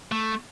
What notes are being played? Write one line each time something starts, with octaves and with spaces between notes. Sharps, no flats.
A3